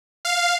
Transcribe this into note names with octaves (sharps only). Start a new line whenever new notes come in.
F5